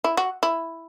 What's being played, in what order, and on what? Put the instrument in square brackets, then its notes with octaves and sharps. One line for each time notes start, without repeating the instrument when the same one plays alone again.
[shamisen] E4
F#4
E4